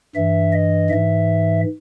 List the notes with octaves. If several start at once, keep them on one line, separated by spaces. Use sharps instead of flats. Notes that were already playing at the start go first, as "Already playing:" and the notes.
G2 E3 E5
D#5
G#2 E3 E5